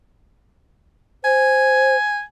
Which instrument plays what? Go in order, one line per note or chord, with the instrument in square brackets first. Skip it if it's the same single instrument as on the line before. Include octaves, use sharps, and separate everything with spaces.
[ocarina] C5 [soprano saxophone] G#5